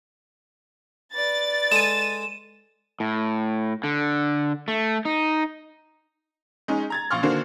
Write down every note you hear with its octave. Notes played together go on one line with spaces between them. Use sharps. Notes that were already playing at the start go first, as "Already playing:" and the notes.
B4 D5 A6
G#3 G#4 A4 D#7 E7
A2
D3
A3
D#4
G#3 C#4 D#4
A#5 G#6 A6
A#1 F5 C6 C#6 F6
D3 D#3 A#3 D4 F#4 C5